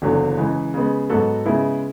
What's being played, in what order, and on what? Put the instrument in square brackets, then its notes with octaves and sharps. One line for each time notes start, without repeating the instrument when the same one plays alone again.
[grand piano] F#1 E2 D3 F#3
C#3 E3 G#3
C#3 G#3 B3
G#2 F#3 B3 F#4 A4
C#3 G#3 B3 E4